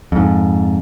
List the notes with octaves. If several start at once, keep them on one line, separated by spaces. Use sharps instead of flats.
F2 G#2